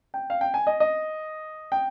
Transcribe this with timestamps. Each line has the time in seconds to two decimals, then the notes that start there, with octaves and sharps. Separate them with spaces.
0.14 G5
0.30 F5
0.41 G5
0.54 G#5
0.67 D#5
0.80 D#5
1.72 G5